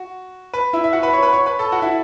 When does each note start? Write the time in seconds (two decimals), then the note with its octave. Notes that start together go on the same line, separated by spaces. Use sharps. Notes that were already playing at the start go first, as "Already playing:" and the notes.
Already playing: F#4
0.54 B4
0.73 E4 E5
0.84 E5
0.93 F#4 F#5
1.03 B4 B5
1.13 C#5 C#6
1.22 B4 B5
1.33 C#5 C#6
1.46 B4 B5
1.59 A4 A5
1.72 F#4 F#5
1.82 E4 E5